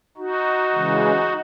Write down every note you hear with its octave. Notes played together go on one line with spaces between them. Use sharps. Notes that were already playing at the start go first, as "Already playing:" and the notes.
D#4 F#4
C#3 E3 G#3